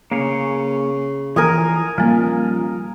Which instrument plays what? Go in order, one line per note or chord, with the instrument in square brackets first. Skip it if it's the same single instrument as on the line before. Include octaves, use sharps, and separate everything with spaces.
[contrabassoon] C#3 [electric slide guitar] A#3 G#4 C#5
[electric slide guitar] E3 F3 [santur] A#4 G#5 D#6
[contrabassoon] D#1 [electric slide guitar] F3 [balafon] G3 A#3